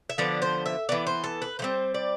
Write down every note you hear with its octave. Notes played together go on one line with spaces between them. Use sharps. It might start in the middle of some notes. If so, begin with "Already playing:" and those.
E5
D3 F3 B3 D5
C5
E5
E3 B3 D5
C5
A4
B4
E3 G3 C4 C5
D5